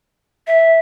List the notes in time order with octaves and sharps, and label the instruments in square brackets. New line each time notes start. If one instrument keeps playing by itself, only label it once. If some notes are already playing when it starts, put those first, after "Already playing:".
[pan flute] E5